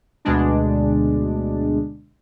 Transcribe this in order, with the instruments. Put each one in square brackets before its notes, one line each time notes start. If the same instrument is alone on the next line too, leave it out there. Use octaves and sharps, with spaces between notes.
[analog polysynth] D2 B2 G#3 D4